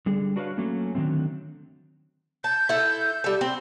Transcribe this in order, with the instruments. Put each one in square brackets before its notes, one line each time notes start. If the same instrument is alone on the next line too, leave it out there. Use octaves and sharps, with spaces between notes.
[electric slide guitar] D3 G3 G#4
D4 F#4 B4 C#5 D#5 F5
F#3 A3 A#3 C#4
D3 D#3 F#3 A3 C4
[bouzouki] A5 [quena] G6
[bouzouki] E4 A4
G3 A4
C4